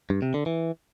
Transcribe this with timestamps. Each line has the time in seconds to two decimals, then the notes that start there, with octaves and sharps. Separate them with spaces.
0.10 G2
0.22 C3
0.34 D3
0.46 E3